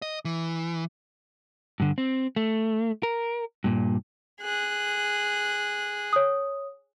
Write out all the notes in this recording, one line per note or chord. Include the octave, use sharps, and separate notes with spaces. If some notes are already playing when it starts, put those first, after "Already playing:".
D#5
E3
G2 D3
C4
A3
A#4
G2 A#2
G#4 F#6
C#5 D#6